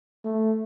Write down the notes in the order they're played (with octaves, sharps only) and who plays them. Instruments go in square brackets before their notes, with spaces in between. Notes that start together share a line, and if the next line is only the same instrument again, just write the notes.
[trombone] A3